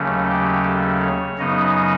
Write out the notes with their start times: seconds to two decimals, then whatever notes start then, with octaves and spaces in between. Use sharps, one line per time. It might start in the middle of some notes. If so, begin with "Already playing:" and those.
Already playing: D#2 C#3 F#3 A3 C#4
0.26 G4
0.63 A4
1.01 C#5
1.38 F#2 C#3 F#3 B3 D#4 D#5